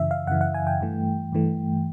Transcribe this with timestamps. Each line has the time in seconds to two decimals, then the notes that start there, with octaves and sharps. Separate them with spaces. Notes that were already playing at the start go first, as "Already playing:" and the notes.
Already playing: F#2 C#3 E3 E5
0.11 F5
0.27 F#2 C#3 E3 F#5
0.41 F#5
0.54 G#5
0.67 G5
0.81 G2 E3 A3
1.32 G2 E3 A3